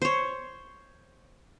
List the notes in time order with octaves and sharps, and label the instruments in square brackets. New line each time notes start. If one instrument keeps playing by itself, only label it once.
[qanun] C5 C#5